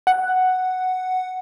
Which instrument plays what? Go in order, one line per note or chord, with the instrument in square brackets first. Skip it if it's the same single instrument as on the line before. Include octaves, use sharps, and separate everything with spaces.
[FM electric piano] F#5